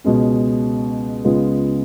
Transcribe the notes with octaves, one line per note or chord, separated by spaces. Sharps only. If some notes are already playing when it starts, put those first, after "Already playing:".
C#2 B2 G#3 C#4
C#2 C#3 G#3 B3 F4